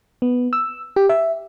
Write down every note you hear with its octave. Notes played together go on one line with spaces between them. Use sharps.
B3
E6
G4
E5